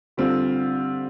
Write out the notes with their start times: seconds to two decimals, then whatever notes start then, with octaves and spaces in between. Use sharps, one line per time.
0.17 D3 G3 C4 F4